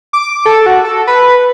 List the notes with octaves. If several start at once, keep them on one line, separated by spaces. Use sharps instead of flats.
D6
A4
F#4
A4
B4